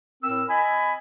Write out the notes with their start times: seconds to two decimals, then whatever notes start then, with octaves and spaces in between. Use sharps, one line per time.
0.23 A2 C4 A#4 E6
0.49 D#5 G#5 B5